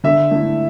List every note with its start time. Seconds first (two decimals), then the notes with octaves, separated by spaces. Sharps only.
0.04 D3 E5
0.31 A3 E4